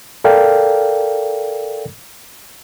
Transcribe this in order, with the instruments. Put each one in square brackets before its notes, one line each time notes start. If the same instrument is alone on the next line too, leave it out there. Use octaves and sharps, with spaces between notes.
[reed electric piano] A4 A#4 D5 F5 G5